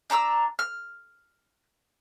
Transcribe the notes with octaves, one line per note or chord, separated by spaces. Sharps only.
D4 A#5 C#6 E6
F6